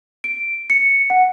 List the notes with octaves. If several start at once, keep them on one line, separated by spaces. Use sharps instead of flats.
D7
C#7
F#5